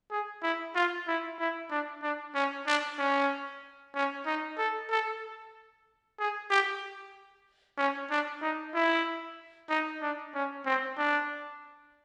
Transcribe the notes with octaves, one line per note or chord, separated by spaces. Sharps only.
G#4
E4
F4
E4
E4
D4
D4
C#4
D4
C#4
C#4
D#4
A4
A4
G#4
G4
C#4
D4
D#4
E4
D#4
D4
C#4
C4
D4